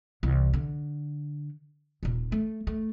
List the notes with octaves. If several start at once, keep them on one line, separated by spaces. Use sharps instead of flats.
C2 E3
D3
D#1 A#2
A3
A3